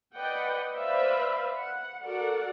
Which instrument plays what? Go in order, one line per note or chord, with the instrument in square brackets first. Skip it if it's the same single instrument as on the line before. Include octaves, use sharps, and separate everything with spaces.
[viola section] B4 D5 D#5 F#5 G5
B4 C5 D5 E5 F5 B5
F#5
F#4 A4 A#4 D5 F#5